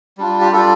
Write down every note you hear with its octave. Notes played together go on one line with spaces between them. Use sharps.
G3 D4 F4
G4
G3 D4 F4 A4